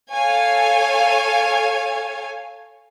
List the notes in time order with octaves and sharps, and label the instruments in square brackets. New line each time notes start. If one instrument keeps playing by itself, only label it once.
[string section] A4 C#5 F5 G#5